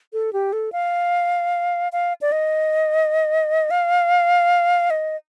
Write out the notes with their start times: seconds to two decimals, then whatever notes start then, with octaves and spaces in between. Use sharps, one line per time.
0.13 A4
0.33 G4
0.53 A4
0.72 F5
1.92 F5
2.21 D5
2.32 D#5
3.71 F5
4.90 D#5